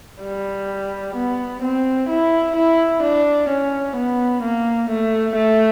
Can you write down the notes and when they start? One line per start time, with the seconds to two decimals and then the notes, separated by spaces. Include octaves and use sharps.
0.22 G3
1.15 B3
1.62 C4
2.09 E4
2.55 E4
3.03 D4
3.49 C#4
3.96 B3
4.42 A#3
4.89 A3
5.35 A3